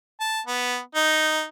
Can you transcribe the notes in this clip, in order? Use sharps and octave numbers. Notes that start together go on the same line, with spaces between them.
A5
B3
D#4